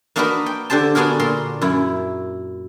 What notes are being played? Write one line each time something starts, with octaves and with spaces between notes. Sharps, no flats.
A#3 D4 D#4 F#4 A#4 B4
G5
D3 D4 G4 C5 A5
B3 D4 F#4 G#4 A#4
A#2 A#4 C6
F#2 E4